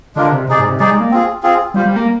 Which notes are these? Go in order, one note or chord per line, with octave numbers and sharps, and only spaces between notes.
D3 G#3 D4 F4 A#4
C3
C3 D#4 G#4 D5
G#2
C3
G3 D#4 G#4 D5
G#3
A#3
C4 F4 G#4
C4 F4 G#4
G3 F4 C5 F5
G3
A#3